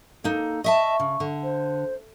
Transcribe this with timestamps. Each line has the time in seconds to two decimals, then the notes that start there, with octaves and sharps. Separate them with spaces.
0.24 A#3 D#4 A4
0.64 D#5 E5 A5 C#6
1.00 C#3
1.20 D3
1.43 C5